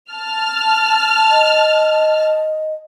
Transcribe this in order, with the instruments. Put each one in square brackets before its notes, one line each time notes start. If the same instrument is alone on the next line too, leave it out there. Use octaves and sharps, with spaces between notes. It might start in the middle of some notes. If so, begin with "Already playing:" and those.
[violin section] A5 F6
[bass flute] D#5